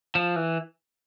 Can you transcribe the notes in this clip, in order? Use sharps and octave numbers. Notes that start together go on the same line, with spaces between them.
F3
E3